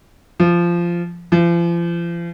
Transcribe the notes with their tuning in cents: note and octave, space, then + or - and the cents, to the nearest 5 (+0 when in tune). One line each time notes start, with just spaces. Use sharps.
F3 -15
F3 -40